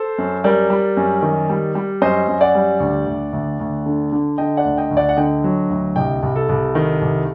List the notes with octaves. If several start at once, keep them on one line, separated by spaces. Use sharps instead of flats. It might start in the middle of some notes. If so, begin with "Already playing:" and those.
Already playing: A4 C5
F#2
G3 A#4 D5
G3
F#2
D#3
G3
G3
F#2 C5 D#5
F#2
D5 F#5
G3
D2
D2
D2
D2
D3
D3
D3 D#5 G5
D5 F#5
D2
D#5 G5
D2
D5 F#5
F#5
D3 D#5 G5
F#3
D2
C2 D#5 G5
C2
A4
C2
D#3
C2